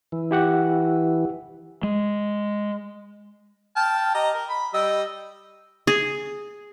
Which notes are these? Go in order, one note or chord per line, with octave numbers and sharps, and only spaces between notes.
E3
E4 G4 F#5
G#3
G5 A5 F6
G4 D#5 A#5
A#4
B5
G3 D#5 E6
G#4